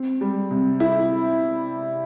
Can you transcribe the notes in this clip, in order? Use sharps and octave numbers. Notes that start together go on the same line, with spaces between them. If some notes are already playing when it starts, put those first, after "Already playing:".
Already playing: C4
G3
C3
E4